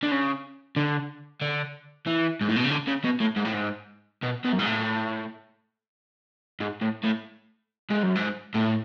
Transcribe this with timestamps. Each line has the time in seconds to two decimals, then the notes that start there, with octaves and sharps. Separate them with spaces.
0.03 D3
0.12 C#3
0.76 D3
1.42 D3
2.07 E3
2.41 G#2
2.49 A2
2.56 B2
2.64 C#3
2.71 D3
2.88 C#3
3.04 B2
3.21 A2
3.36 G#2
3.45 A2
3.54 G#2
4.23 B2
4.44 B2
4.52 F#2
4.59 G#2
4.66 A2
6.61 G#2
6.82 A2
7.04 A2
7.90 G#2
8.03 F#2
8.15 G#2
8.54 A2